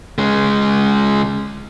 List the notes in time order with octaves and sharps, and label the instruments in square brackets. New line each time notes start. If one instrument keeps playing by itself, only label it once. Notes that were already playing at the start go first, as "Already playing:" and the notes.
[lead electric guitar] C#3 G#3